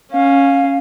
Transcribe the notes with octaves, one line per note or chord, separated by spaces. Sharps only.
C#4 F5